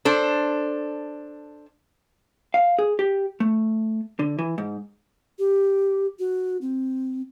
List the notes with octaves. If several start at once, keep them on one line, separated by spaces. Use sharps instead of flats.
D4 A4 C5
F5
G#4
G4
A3
D3
E3
G#2
G4
F#4
C4